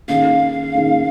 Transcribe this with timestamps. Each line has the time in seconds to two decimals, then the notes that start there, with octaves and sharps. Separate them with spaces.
0.08 D#3 A#3 C#4 G#4 F5
0.74 D#3 A#3 C#4 G#4